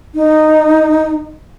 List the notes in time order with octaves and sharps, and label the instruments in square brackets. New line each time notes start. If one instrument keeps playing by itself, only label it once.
[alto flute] D#4